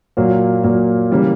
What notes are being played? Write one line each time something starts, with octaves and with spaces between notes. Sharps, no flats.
A#2 F#3 A#3
A#2 F#3 A#3
C#3 E3 G3 A#3